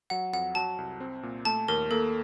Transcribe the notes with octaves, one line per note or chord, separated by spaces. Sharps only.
F#3 F#5
F2 F#5
F#3 A5
C2
C4
A#2
A3 A5
D#2 A#4
A#3 A4